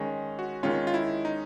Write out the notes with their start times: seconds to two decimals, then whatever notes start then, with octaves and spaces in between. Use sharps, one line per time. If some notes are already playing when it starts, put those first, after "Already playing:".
Already playing: D#3 G#3 C#4
0.39 F#4
0.63 D#3 G#3 C#4 F4
0.87 F4
0.94 E4
1.25 D#4